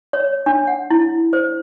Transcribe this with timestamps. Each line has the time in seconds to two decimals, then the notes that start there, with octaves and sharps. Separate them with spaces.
0.13 C#5
0.46 D4
0.67 F#5
0.90 E4
1.33 C5